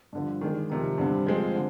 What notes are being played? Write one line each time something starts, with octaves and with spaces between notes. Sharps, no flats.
G2 D3 F3
D#3 G#3 D4
F2 C3 D#3
G2 D3 G3 C4
F3 G#3 C4
D3